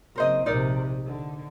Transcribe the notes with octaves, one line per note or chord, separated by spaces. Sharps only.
F#1 C4 A#4 C5 D#5
A#1 C3 D#4 A#4 D5
D3